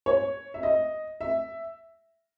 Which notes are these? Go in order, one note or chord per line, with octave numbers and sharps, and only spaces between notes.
C#5
E5
D#5
E5